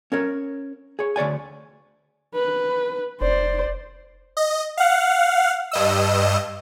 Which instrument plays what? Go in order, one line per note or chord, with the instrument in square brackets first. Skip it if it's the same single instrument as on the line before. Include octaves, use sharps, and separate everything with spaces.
[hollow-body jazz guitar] C#4 A#4 C#5
G#4 C#5
D2 C#5 D5 G#5
[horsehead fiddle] B4
[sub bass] F1 [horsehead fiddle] C5 D5
[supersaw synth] D#5
F5 F#5
G2 D#5 E6